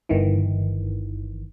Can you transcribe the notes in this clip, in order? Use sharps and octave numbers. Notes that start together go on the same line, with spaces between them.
G1 D#3 E3